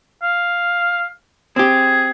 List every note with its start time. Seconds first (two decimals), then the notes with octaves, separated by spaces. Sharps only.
0.23 F5
1.56 C4 G4 G#4